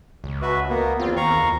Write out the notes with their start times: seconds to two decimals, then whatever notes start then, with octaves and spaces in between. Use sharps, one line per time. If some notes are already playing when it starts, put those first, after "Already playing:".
0.24 C#2
0.42 F#4 B4 E5
0.69 A#3 B3
1.00 E2 C4 F4
1.17 D#2 F5 A#5 C#6
1.43 D2